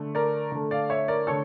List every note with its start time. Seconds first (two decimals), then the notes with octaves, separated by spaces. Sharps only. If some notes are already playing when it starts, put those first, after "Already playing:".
Already playing: D3 A3
0.15 A#4 D5
0.52 D3 A3
0.71 D5 F5
0.90 C#5 E5
1.08 A#4 D5
1.27 D3 A3 A4 C#5